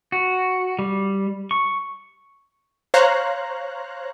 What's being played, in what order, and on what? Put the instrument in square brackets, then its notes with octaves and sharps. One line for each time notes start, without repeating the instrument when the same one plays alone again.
[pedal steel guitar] F#4
G3
C#6
[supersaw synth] C5 C#5 F5 A#5 F#6